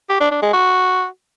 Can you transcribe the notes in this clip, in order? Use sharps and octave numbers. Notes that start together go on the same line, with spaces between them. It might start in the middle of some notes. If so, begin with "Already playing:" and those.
G4
D4
D4
G#3
F#4